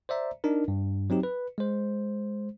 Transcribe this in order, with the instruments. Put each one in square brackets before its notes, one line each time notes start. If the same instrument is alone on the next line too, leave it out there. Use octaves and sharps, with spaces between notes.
[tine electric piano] C5 D5 E5 A#5
D4 D#4 A#4
G2
F#3 C4 D#4 G4
B4
G#3 C5